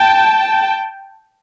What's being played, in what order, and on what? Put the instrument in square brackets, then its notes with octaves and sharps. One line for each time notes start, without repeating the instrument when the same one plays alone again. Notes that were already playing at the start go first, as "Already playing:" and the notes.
Already playing: [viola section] G5 A5